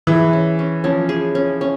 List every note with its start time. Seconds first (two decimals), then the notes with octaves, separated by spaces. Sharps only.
0.07 E3 G#4
0.33 C#4
0.59 C#4
0.84 F3 C#4
1.09 G#4
1.35 C#4
1.61 C#4